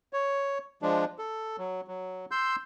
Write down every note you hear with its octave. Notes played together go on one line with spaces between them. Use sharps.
C#5
F3 G#3 D4
A4
F#3
F#3
C6 E6 G6